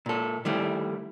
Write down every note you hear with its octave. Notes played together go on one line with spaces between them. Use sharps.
A#2 A4
D#3 G3 A3 E4